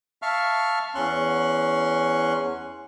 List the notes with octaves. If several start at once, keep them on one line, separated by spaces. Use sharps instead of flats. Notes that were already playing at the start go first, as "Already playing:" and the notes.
E5 F5 A5 C#6 F6
E2 C#4 C6 C#6 F#6